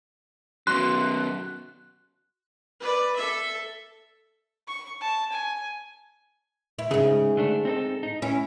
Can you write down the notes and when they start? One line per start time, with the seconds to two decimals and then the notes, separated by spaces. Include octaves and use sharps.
0.67 F#2 B2 F#4 C6 F#6
2.80 B4 D5
3.16 A4 E5
4.68 C#6
5.01 A5
5.32 G#5
6.79 E4
6.91 G#2 C#3 G#4
7.37 D3 A3 D4
7.65 C4 D#4 A4
8.03 D#4
8.22 C#4 E4